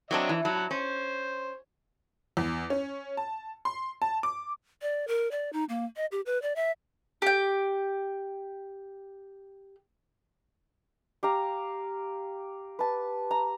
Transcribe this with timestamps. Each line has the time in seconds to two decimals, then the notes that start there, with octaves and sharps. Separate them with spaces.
0.11 F#3 C4 D4 C#5 D#5 E5
0.29 E3
0.45 F#3 F#5 A5 B5
0.71 C#4 C5
2.37 E2
2.70 C#4
3.17 A5
3.65 C6
4.02 A5
4.23 D6
4.82 D5
5.08 A#4
5.31 D5
5.53 D#4
5.69 A#3
5.96 D#5
6.12 G4
6.26 B4
6.42 D5
6.56 E5
7.22 G4 G5
11.23 G4 F5 A#5
12.79 B4 A5
13.31 A#5